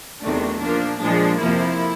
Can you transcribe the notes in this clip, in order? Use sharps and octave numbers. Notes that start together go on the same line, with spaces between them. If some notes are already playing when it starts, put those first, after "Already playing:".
E2 C3 D#3 F#3 A3 D4
A#2 F3 A#3 D4
A#2 F3 G#3 D4
F2 C3 F3 A#3 E4